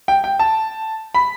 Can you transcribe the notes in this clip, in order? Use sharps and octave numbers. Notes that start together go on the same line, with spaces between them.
G5
G5
A5
B5